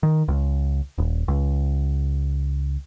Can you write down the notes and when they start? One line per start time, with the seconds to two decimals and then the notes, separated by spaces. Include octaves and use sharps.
0.03 D#3
0.28 C#2
0.98 D#1
1.28 C#2